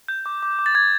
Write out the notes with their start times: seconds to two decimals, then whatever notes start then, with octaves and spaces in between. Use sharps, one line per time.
0.08 G6
0.26 D6
0.43 D6
0.59 D6
0.66 A6
0.75 D6 G#6